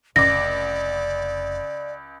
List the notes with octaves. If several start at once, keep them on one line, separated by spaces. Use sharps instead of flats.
F1 C#2 D5 D6 A#6